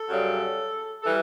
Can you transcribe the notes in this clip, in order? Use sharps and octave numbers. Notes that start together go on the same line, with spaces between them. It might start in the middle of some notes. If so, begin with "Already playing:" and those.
Already playing: A4
F#2 C#3 G3
E3 G3 A4